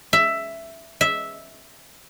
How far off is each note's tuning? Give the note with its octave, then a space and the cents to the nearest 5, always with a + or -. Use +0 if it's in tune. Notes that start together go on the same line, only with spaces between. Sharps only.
E5 +10
E5 -5